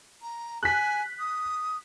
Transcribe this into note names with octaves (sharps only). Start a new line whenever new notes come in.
A#5
G#5 F#6 B6
D#6